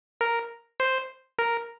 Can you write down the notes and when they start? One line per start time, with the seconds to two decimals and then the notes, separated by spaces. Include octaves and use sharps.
0.21 A#4
0.80 C5
1.39 A#4